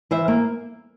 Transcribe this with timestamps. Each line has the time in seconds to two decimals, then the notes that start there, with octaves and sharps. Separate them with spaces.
0.11 E3 C5 E5
0.28 A#3